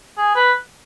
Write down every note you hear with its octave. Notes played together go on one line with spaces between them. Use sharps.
G#4
B4